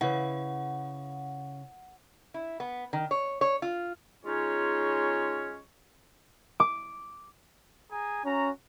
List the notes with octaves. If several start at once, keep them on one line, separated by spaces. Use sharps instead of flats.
C#3 E4 B4 F#5
E4
B3
D#3
C#5
C#5
F4
C#3 G#3 C#4 D#4 F4 C#5
D6
G#4 G#5 A#5
C#4 F#4 A#5